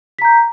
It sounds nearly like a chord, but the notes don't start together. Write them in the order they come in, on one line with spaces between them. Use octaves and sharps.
B6 A#5 G6